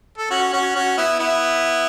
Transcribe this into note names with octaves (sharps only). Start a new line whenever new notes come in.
A4
C#4 F#4
C#4 F#4
C#4 F#4
B3 E4
B3 E4